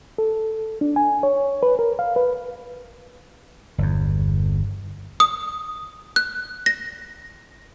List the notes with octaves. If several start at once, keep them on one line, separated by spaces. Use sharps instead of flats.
A4
D4
G#5
C#5
B4
A#4
F5
B4
G1 E2
D#6
F#6
A#6